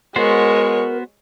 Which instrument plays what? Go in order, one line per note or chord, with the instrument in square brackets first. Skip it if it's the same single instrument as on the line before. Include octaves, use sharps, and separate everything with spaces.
[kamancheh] G#3 C#5 [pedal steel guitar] B3 F#4 C5 [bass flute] A#4